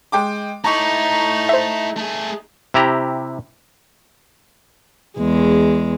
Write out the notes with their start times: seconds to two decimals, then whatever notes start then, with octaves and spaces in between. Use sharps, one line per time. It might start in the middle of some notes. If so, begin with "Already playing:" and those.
0.12 G#3 G5 D6
0.64 A3 D#4 E4 A#5 C#6
1.49 C5 E5
1.97 A3 G#4
2.74 C3 E4 G4 A#5
5.18 E2 G#3